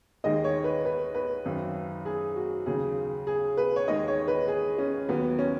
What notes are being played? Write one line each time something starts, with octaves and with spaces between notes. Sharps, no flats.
D#2 D#3 G#3 D#5
C#5
B4
B4
B4
G#1 F#2 D#3
G#4
F#4
D#2 C#3 F#3 G#4
G#4
B4
C#5
D#2 D#3 G#3 D#5
C#5
B4
G#4
C#4
D#2 D#3 F#3 B3
C#4